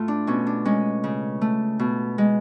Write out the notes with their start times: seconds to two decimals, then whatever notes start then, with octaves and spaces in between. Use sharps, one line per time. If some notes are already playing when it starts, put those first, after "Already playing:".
Already playing: A2 A3 F4
0.08 D4
0.27 B2 C#4
0.47 D4
0.65 G#3 C#4
1.04 C#3
1.41 A3
1.79 B2
2.18 G#3